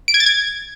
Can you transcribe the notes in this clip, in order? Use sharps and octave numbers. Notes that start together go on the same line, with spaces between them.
D7
G#6
A6
G#6